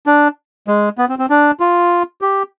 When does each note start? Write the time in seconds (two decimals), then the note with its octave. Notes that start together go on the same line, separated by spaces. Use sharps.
0.07 D4
0.68 G#3
0.98 B3
1.09 C4
1.19 C4
1.30 D4
1.60 F4
2.21 G4